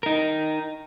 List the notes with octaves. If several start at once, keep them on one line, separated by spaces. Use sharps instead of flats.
D#4 A#4